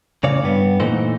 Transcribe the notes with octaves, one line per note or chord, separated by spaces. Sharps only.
A2 C#3 C#5 D5 F5
G2 B3
A#2 E3 A3 D#4 C5